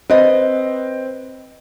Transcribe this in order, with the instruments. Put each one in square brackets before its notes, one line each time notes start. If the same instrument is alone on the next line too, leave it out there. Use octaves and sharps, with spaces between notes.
[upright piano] C4 [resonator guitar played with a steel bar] B4 D#5